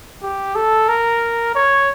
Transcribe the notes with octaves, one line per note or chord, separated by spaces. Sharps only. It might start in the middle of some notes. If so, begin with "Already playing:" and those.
G4
A4
A#4
C#5